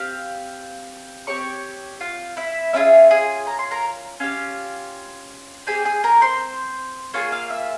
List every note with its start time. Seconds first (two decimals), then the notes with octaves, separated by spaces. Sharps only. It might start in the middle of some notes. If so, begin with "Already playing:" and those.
Already playing: C4 G4 F5 F6
1.27 C4 G4 C#5 C#6
2.00 F4 F5
2.37 E4 E5
2.73 C#4 E4 F4 G#4 E5
3.11 G#4 G#5
3.47 A#5
3.59 C6
3.71 A#4 A#5
4.20 C#4 F4 G4 F5
5.67 C4 G4 G#4 G#5
5.85 G#4 G#5
6.04 A#4 A#5
6.21 C5 C6
7.14 A#3 F4 G#4 C#5 C#6
7.32 F5 F6
7.50 E5 E6